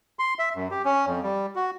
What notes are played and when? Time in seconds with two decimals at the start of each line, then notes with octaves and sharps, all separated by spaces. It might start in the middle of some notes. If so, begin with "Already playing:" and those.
0.19 C6
0.39 E5
0.55 F#2
0.71 G4
0.85 C#4
1.06 F2
1.23 G3
1.56 F#4